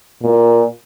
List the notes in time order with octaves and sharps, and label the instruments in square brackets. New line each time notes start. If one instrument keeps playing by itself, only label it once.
[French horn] A#2